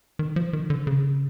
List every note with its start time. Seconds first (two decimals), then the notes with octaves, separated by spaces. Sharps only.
0.19 D#3
0.36 F3
0.53 D#3
0.70 D3
0.87 C#3